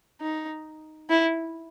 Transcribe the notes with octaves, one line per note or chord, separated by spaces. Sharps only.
D#4
E4